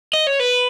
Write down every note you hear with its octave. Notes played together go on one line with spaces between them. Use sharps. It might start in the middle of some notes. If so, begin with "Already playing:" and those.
D#5
C#5
B4